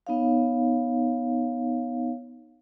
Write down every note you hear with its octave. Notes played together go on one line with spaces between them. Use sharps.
B3 D#4 C#5 F5